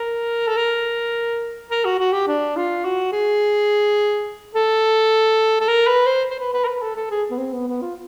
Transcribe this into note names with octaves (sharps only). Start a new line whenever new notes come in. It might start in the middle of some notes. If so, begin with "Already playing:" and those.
Already playing: A#4
A4
A#4
A#4
F#4
F#4
G4
D4
F4
F#4
G#4
A4
A4
A#4
B4
C5
C5
B4
B4
A#4
B4
A4
A4
G#4
B3
C4
B3
B3
F4